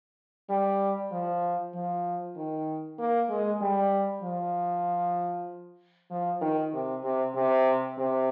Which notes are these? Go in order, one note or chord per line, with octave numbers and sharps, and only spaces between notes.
G3
F3
F3
D#3
A#3
G#3
G3
F3
F3
D#3
C3
C3
C3
C3